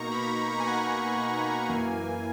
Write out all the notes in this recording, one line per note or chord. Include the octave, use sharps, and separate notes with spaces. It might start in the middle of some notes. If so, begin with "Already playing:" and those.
Already playing: B2 A#3 D#4 A#5 C#6
B5
A#5
A#5
G#5
F#5
G#5
F#2 E3 A#3